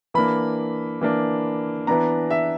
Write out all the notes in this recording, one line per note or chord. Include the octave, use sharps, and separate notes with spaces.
E3 A#3 D4 B5
E3 A#3 D4
E3 B3 D4 A#5
E5